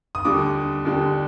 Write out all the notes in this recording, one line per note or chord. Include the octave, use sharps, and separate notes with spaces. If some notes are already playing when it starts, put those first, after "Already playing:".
D#6
D#2 D3 G3 D6
D#2 D3 G3